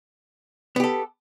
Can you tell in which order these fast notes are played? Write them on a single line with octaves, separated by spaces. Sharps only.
B3 G4 A4